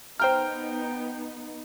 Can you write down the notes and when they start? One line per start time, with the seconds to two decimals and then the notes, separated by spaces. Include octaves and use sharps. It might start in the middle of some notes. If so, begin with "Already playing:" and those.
0.20 B3 D#4 C5 G5 A#5 F6